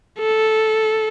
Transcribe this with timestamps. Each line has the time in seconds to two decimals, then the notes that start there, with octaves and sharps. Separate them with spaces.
0.19 A4